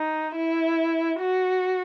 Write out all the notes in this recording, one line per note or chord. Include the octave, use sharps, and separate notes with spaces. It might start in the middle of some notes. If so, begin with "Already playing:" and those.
Already playing: D#4
E4
F#4